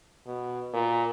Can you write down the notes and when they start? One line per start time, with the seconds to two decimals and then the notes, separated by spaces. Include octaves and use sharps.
0.27 B2
0.73 A#2